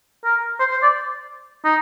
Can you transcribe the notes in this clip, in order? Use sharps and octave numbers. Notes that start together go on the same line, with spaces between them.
A#4
C5
C5
D5
D#4